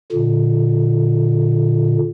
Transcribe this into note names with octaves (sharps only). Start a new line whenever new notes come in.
A#2 D3